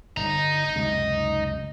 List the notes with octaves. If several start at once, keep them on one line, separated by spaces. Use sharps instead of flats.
G1 D3 D#5 A#5
C#2 F#2 C3